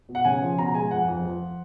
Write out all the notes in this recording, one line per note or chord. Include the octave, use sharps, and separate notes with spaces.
B2
F#5
C#3 G#5
F3
B2 A#5
G#3 G#5
F2 F#5
F2
F3